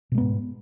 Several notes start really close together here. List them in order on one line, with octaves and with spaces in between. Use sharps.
B2 G#3 B3 G#2